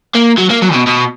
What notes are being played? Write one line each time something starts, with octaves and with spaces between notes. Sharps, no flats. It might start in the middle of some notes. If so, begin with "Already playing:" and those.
A#3
F#3
A#3
F#3
B2
B2